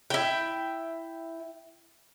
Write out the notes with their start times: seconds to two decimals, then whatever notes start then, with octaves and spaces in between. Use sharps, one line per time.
0.10 E4 G5